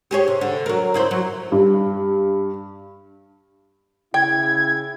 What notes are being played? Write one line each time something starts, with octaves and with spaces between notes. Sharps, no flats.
G4 G#4 C#5
C3
D3
F#3 A#4
C#3 E4 C5
F#3
G2
C#3 E4 G5 G#6